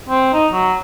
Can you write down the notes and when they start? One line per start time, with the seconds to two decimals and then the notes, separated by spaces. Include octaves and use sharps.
0.09 C4
0.33 D#4
0.52 F#3